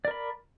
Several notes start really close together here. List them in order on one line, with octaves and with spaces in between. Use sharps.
D5 A#4 B5